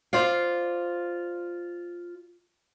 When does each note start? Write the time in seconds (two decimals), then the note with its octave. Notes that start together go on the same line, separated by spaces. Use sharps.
0.13 F4 C5 D5 F5